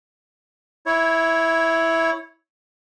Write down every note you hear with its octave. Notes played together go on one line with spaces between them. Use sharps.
E4 C#5